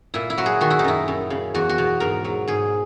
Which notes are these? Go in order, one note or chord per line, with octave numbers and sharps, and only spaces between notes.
A#2 E4
E4
F#3 F#4
G#4
D#3 F#4
E4
D#4
F#2 E4
F#2
C#3
E2 F#4
F#4
B2
G#2 A#4
F#3
G#2 G#4